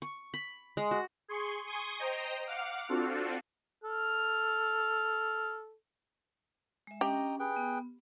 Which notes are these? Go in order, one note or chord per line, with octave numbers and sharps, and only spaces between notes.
C#6
B5
G#3
F#4
G#4 C6 C#6
G#5 C6 C#6 D#6
C5 D#5 G5 A#5
F5 F#5 D6 F6
C4 D4 F4 F#4 A4
A4 F6
G#3 E5
C#4 D4 G4 D#5 G5 A#5 D6
G#4 B4 G5
B3